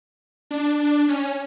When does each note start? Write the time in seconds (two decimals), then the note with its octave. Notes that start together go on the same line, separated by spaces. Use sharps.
0.51 D4
0.80 D4
1.09 C#4